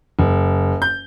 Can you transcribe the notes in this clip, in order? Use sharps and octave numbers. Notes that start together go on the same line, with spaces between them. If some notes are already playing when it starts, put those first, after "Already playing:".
F#1
G6